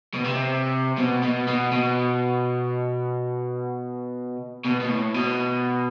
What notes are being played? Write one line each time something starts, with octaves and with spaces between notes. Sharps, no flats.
B2
C3
B2
B2
B2
B2
B2
B2
A2
B2